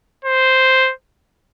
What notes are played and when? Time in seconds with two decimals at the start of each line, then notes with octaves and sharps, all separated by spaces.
0.25 C5